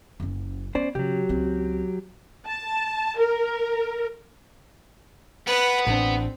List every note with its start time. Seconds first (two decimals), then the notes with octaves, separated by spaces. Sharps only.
0.20 F#1 C#4
0.75 B3 C#4 C5 D5
0.95 C#3 F#3 G4
1.29 C#2 C4
2.47 A5
3.18 A#4
5.47 B3 B4
5.87 A1 C4 D4